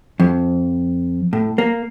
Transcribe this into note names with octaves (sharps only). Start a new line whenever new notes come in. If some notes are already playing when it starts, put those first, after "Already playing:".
F2
A2
A#3